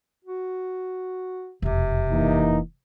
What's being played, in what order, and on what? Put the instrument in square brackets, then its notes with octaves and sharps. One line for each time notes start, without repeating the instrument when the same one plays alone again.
[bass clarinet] F#4
[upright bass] E1 F2 [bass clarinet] C3
[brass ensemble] E3 A#3 D#4